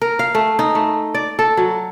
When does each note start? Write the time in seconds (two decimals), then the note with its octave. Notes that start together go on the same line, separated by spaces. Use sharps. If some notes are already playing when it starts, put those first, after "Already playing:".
0.02 A#4
0.19 F5
0.35 A3
0.59 D#4
0.75 A3
1.14 D5
1.39 A4
1.57 F#3